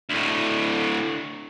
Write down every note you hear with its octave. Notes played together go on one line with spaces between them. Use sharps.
D2 A2